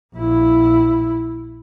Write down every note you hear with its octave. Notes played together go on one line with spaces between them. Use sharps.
A#1 E4